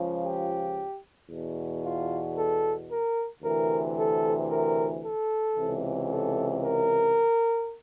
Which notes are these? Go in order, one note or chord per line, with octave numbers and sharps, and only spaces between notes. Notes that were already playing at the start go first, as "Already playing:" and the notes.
Already playing: C#2 C#3 F3
G4
E2 B2
F4
A4
A#4
D2 C3 E3 A#4
A4
A#4
A4
C#2 C3 E3
A4
A#4